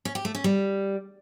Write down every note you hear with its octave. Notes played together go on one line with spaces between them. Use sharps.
C#4
G4
A3
C#4
G3